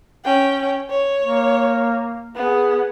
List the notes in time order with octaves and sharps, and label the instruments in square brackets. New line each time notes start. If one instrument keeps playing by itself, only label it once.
[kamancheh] C#4 G5
C#5
[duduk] A#3
[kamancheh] B3 [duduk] G#4